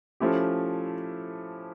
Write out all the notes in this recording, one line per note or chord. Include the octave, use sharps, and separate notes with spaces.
F3 A3 C#4 E4 G4